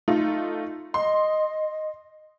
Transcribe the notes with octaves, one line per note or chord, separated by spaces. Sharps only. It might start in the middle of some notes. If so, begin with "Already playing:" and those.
A3 D#4 F4
D#5 C6